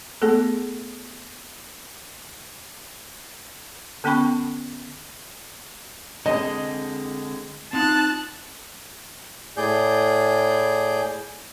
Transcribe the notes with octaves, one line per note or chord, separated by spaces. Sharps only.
A3 B3 G#4 A4
D3 B3 C#4 G5 B5 C#6
D3 G#3 C4 D#5
C4 D#4 F4 A5 F#6
A2 G#4 D5 G6